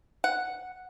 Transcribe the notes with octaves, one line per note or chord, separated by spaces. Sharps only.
F#5